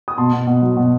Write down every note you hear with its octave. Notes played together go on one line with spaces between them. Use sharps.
D#6
B2 A5 C6
B2
B2
F#3
B2